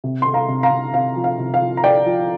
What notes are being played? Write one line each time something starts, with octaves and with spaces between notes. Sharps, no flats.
C3
C3 C6
F5 A#5
C3
F5 A#5
C3
C3 F5
F3
F5
C3
F5
F3
A#5
F3 D5 G5
F3